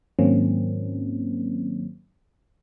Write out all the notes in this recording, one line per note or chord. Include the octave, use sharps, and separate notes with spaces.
G#2 D#3 F#3 A#3 C4 C#4